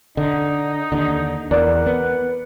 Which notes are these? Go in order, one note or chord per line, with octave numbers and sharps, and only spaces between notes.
D3 D#4
D#2 D3
E2 A#4 D5 F#5
B3